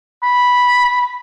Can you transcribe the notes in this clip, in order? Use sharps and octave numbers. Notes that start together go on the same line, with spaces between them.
B5